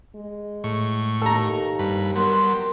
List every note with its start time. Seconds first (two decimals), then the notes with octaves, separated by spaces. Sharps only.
0.15 G#3
0.64 A2 C#6
1.22 D#2 A4 A#5
1.79 G2 B4
2.15 F#3 G3 B3 A#4 C6